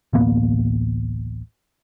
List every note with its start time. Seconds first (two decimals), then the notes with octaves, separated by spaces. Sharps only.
0.13 D1 A1 A#3 B3